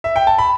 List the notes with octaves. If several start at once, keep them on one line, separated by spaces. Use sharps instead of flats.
E5
G5
A5
B5